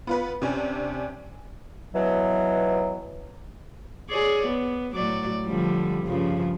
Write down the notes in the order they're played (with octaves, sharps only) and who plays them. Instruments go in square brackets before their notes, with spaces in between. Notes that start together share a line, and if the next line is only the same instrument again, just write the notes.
[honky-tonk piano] B3 F4 B4
C3 C#4 D4
[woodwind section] B2 E3 F#3
[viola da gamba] G#4 C#5 D5
B3
A2 F#3 D5
D3 F3 G3
G2 C#3 F3